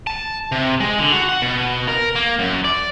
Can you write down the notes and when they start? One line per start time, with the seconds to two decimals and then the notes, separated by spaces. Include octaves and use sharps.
0.07 A5
0.52 C3
0.80 G#3
0.99 D3
1.12 F#4
1.29 F#5
1.42 B2
1.88 A#4
2.16 A#3
2.39 F#2
2.64 D5